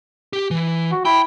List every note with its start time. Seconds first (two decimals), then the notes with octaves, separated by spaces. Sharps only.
0.33 G4
0.51 E3
0.92 F#4
1.05 E4 G5